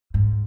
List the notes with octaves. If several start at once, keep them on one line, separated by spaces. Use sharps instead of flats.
G#2